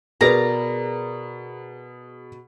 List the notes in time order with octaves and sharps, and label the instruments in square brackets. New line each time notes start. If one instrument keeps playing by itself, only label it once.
[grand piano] B2 [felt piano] G#4 B4 [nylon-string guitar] A#4 D5 [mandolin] A#5